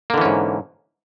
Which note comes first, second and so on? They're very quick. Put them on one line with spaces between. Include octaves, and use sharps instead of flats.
A#3 D3 E3 C#4 G#2